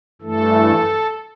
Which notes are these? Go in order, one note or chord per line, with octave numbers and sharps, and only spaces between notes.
G2 E3 A3 A4